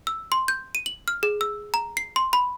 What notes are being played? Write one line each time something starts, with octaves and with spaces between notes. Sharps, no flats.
E6
C6
G6
D#7
F#7
F6
G#4
E6
A#5
C7
C6
B5